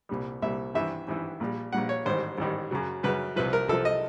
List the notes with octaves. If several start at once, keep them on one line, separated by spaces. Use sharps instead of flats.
C2 A#2 G3
C2 A#2 G3 E5
G#1 G2 E3 E5
G#1 G2 E3
A#1 A#2 G3
A#1 A#2 G3 F#5
C#5
A1 G#2 D#3 G3 C5
A1 G#2 D#3 G3
F#2 C#3 F#3
F#2 C#3 F#3 B4
C2 C3 F3 B4
A#4
C2 C3 F3 A4
D#5